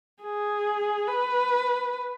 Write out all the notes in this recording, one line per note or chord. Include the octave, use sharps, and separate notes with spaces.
G#4
B4